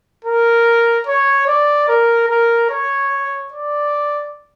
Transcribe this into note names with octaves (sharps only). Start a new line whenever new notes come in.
A#4
C#5
D5
A#4
A#4
C#5
D5